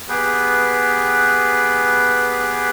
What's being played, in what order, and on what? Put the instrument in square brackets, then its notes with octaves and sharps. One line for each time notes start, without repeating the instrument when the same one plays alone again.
[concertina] B3 G4 G#4 B4